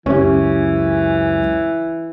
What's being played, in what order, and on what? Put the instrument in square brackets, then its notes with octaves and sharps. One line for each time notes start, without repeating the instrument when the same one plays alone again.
[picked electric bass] C#2 F#2 [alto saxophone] E3 [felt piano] C#4 G4